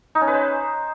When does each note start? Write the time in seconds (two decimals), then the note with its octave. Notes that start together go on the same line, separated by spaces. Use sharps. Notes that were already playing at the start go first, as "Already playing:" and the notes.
0.15 D#4
0.21 C#4
0.27 B4
0.34 C5